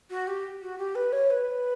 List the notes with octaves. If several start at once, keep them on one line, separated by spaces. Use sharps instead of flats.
F#4
G4
F#4
G4
B4
C#5
B4